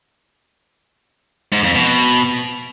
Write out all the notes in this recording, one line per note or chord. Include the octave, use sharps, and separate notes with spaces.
G#2
F2
B2